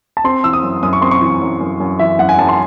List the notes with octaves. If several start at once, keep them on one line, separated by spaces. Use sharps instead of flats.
A5
C4 C6
E3 E6
D#6
F#2
F#2 D#6
C#6
C4 C6
C#6
E3
F#2
F#2
F#2
E3 E5
F#2 F#5
G#5
F#2 A5
C6